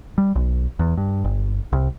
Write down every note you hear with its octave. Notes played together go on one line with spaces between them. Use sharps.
G3
B1
E2
G2
G1
C2